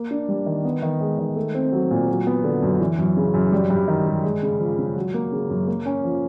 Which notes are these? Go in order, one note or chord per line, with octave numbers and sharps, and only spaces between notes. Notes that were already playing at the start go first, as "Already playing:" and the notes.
Already playing: A#3
D4
G3
D#3
B3
D#3
G#3
D#3
A3
C4
F#3
A#2
F#3
B3
D3
F#2
E3
F#2
C#3
F#2
G3
G2
D#3
G2
G#3
C#3
F3
C#3
F#3
A#3
C#3
F#2
A#3
C#4
F3